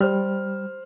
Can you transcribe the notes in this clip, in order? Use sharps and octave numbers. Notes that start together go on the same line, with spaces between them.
G3 C5 F6